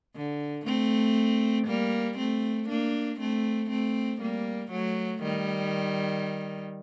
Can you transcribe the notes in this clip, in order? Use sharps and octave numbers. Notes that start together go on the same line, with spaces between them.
D3
A3 C4
G3 A#3
A3 C4
A#3 D4
A3 C4
A3 C4
G3 A#3
F#3 A3
D#3 G3